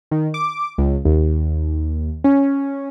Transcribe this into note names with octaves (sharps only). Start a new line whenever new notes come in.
D#3
D6
C#2
D#2
C#4